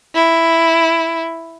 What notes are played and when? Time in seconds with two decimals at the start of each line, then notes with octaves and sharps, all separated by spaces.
0.15 E4